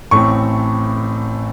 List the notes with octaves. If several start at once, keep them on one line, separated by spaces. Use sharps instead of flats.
A1 A2 A3 C4 C#6